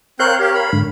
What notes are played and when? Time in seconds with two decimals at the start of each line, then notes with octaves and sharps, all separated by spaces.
0.20 C4 A#4 C#5 F5 F#6 G6
0.40 G4
0.55 B5
0.73 G#2 D3